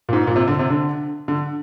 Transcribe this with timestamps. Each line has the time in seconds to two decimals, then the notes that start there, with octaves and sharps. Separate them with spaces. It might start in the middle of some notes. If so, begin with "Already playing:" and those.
0.09 A#2
0.13 G#2
0.27 A#2
0.36 C3
0.48 D3
0.59 C3
0.70 D3
1.28 D3